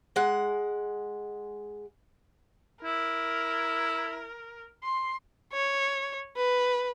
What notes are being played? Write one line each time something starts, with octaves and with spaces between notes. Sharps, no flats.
G#3 F#5
E4 A#4
C6
C#5
B4